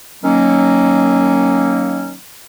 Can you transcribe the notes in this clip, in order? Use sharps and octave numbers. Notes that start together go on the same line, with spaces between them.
D#3 F#3 A#3 C#4